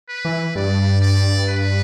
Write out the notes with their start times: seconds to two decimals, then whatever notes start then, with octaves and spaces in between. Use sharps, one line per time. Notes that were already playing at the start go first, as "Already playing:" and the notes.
0.09 B4
0.25 E3
0.56 G2 D5
1.02 D5
1.49 B4